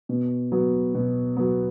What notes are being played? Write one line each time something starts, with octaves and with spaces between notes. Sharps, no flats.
B2
F#3 B3
B2
F#3 B3